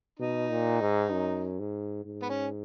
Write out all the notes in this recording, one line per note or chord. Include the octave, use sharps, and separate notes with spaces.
B2 D#4
A#2
G#2
F#2
G#2
G#2
B3
C#4